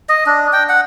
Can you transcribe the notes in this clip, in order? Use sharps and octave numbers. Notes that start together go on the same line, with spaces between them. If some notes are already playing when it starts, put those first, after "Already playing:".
D#5
D4
G5
F#5